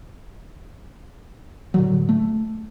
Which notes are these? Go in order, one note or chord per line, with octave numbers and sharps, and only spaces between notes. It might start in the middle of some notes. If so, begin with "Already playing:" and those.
A2 D3 F#3
A3